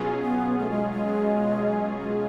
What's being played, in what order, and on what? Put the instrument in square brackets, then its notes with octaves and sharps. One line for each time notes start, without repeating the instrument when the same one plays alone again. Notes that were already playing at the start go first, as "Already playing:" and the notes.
Already playing: [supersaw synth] B2 F#3 C#4 F4 G#4
[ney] B3
A3
G#3
G#3
G#3